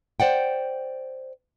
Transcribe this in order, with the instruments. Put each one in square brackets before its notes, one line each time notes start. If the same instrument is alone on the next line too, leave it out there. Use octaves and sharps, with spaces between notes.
[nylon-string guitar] C5 D5 F#5 G5